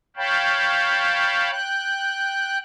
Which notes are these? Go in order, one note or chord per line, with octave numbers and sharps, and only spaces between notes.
C#5 F5 G5 A5 B5
G5 F#6